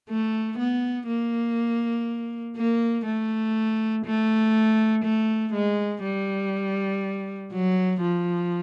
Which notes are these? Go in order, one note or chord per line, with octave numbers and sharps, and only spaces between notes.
A3
B3
A#3
A#3
A3
A3
A3
G#3
G3
F#3
F3